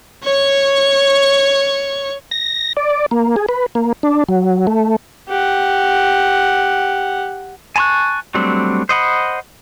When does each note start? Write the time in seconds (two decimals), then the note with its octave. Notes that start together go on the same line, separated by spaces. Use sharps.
0.24 C#5 C#6
2.31 A#6
2.77 D5
3.11 A#3
3.36 G#4
3.49 B4
3.75 A#3
4.03 D4
4.29 F#3
4.67 A3
5.29 G4 F#5
7.76 G#5 A5 B5 C#6 F#6
8.35 F#3 G3 A3 C4 D4
8.89 C5 D#5 F#5 B5